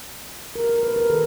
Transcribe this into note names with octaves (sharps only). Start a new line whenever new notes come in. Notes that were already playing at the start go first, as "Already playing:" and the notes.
A#4
A#4
B4
A#4
D#3 A4